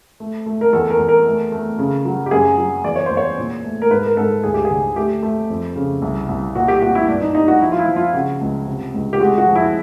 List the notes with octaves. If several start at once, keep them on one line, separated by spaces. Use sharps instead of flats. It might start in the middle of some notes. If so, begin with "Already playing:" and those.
A3
A3
A#4
E2 A4
A#4
E2
A#4
A3
A3
C#3
F#3
G4
F#2 G#4
F#3
E2 D5
C#5
E2 C5
C#5
A#2
A3
A#4
G#2 B4
A#4
G#2 A4
D2 G#4
G4
G#4
D3
A3 G4
A3
F2
C#3
C2
C2
A#2 F#4
G4
A#2 F#4
E4
G2 D4
D#4
G3 D#4
F#4
F3 E4
F4
E4
F3
F4
C#3 F#4
C#2
C3
C#2
G4
G#3 F#4
F#4
F3
E4